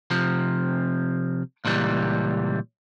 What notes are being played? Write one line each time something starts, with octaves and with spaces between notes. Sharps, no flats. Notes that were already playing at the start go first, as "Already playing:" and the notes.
C3 F3 C4
C#2 A#2 E3 G3